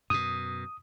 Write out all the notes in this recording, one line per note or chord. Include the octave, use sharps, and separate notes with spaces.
F#2 B2 D#6